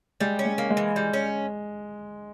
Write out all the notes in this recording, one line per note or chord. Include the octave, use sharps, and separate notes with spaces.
G3 G#3
C#4
G#3
A#3
G#3
E3
G3
C#4